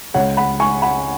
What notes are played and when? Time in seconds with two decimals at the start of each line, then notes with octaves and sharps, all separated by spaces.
0.14 C#2 C#3 G#3 C#4 C#5 F#5
0.37 F#5 B5
0.60 G#5 C#6
0.82 F#5 B5